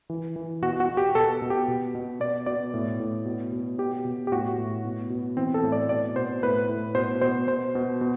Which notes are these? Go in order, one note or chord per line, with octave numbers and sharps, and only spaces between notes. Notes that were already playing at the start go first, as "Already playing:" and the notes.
E3
E3
B2 F#4
F#4
B2
G4
B2 A4
B2
G4
B2
B2
B2 D5
B2 D5
A2
A2
B2
B2
B2 G4
B2
G4
A2 F#4
A2
B2
B2
E3 C4
A4
A2
D5
B2 D5
B2 C5
A2 B4
A2
B2 C5
B2 C5
B2 C5
B2
B2